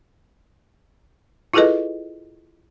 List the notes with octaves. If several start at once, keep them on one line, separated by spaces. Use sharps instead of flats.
E4 F4 G#4 A4 B4 D#5